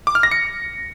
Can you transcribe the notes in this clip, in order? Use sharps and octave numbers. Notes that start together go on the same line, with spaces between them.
D6
F6
A#6
C#7